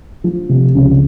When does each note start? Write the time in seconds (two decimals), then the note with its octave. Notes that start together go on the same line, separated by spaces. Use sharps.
0.24 F3
0.49 C3
0.75 C#2